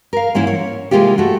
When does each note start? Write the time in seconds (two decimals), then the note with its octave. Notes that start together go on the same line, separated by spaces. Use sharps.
0.13 A#4 F5
0.35 G#2 E3 A#3 C#4 E4
0.47 C#5
0.91 C3 E3 G#3 A#3 F4 G4
1.18 A3 F#4